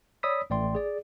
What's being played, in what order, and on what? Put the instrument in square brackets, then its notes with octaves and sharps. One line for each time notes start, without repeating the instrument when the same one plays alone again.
[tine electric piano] C#5 D5 B5 D#6 E6 B6
A1 A3 D5 G5 C6
G#4 D5